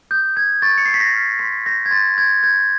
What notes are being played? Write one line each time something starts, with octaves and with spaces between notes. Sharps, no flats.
D#6 G6
G6 G#6
C#6 A6
C#7
C7
C#6
B6
A#6
F6
C6 B6
G6 A#6
G#6
C6 A6
C6 G#6
G6 G#6